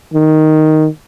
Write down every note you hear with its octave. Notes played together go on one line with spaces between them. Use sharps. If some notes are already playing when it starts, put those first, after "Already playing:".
D#3